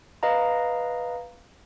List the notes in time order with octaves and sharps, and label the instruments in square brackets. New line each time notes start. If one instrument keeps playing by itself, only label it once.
[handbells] B4 D#5 F5 A#5